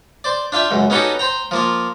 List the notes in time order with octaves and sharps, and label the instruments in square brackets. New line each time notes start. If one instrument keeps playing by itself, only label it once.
[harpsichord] C5 D5
D4 F4 E5 G5
C#2 F#2
B3 C#4 D#4 F#4 G4 A4
C5 G5 A#5
F3 A#3 F4